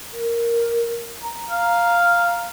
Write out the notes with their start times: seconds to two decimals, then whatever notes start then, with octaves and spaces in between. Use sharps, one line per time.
0.13 A#4
1.22 A#5
1.50 F5